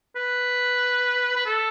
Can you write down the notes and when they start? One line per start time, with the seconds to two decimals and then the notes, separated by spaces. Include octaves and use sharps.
0.16 B4
1.36 B4
1.46 A4